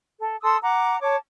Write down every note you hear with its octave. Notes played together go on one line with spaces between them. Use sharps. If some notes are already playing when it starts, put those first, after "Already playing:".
A4
A4 C6 D#6 E6
F#5 A#5 D6
C#5 A5 D6